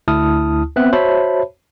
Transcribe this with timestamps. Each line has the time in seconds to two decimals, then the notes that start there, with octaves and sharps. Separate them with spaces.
0.08 D2 E4 A5 D#6 F6
0.76 B3 C4 E5 F#6
0.93 F#4 C5 C#5 E5 A5 B5